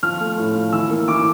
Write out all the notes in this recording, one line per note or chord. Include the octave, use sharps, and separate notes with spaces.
F3 F6
A3
A2
F3
E3 E6
A#3
E3 D6